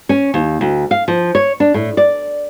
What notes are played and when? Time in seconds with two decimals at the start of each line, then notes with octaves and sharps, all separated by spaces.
0.09 C#4
0.34 D#2
0.61 D2
0.91 F5
1.08 F3
1.35 C#5
1.60 D4
1.74 A2
1.97 D5